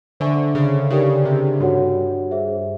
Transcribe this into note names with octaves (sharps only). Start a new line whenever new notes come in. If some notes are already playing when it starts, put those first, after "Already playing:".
D3 C5 E5 G#5 C#6
C#3
C#3 D#4 G4 A#4 D5 G5
C3
G2 F#4 A4 C#5 F#5
G#4 C5 E5